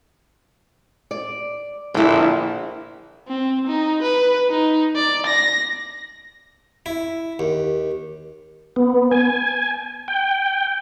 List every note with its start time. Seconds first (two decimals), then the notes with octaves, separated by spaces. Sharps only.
1.11 D5
1.94 A#1 D3 E4
3.28 C4
3.67 D#4
4.02 B4
4.50 D#4
4.96 D5
5.26 A#6
6.86 E4
7.39 D#2
8.76 B3
9.11 G#5
10.08 G5